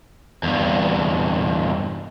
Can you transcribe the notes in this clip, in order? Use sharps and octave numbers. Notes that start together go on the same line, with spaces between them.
E2 G2